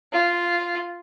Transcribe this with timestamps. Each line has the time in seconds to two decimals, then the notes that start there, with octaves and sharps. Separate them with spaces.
0.13 F4